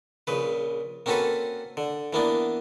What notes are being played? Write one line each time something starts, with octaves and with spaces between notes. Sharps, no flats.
A#1 C#3 B4
A#3 C4 C#4 F#4 A4 B4
D3
E3 A#3 B3 D4